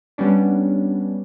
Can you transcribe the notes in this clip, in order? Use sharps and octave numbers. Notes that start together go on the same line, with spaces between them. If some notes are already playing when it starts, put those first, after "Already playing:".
G3 B3 C#4 D4